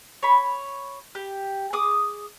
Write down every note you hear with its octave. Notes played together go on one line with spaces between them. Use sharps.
C#5 B5
G4
G#4 D6 D#6